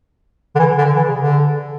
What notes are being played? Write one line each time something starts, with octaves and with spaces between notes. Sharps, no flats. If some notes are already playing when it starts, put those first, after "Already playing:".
D3
E3
D3
E3
C#3
D3